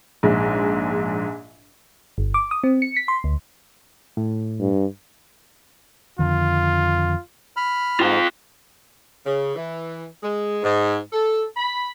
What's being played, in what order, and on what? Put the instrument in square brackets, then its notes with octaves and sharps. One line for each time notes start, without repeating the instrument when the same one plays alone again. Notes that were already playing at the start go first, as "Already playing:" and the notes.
[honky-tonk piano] A#1 G#2
[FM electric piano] G1
D6
D#6
C4
C#7
B6
C6
D2
[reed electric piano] A2
[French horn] G2
[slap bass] F2 D3 D#3 [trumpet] F4
[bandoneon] B5 F6
[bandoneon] G#2 [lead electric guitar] F4 G5
[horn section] C#3
E3
G#3
G#2
A4
B5